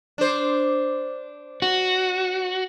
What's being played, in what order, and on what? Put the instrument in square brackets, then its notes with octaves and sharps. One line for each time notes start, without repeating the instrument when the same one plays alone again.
[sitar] D4 C5
[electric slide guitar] F#4